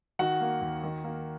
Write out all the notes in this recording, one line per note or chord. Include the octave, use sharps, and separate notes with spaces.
D#3 F#4 F#5
A#3
D#2
D#3
A#3